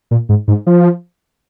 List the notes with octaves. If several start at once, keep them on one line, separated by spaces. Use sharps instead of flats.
A#2
G#2
G#2
F3